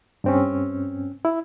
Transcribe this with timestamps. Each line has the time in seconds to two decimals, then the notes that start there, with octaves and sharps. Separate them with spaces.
0.24 G2 C4 C#4
1.25 E4